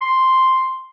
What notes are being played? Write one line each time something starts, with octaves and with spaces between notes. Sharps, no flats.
C6